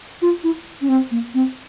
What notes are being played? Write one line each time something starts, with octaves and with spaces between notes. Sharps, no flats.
F4
E4
C#4
C4
A#3
C4